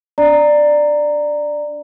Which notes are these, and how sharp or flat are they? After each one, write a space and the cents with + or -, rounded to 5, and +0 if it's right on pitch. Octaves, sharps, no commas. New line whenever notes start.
D4 -20 D5 +10 A#5 -10